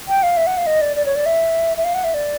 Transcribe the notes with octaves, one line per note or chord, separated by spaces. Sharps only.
G5
F5
E5
F#5
F5
D#5
D5
D5
C#5
D5
E5
E5
F5
F#5
E5
D5